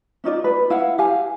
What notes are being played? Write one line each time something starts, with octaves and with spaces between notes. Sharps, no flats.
C#4 D#4 F4 D5
B4
E4 F5 F#5
G4 F5 G#5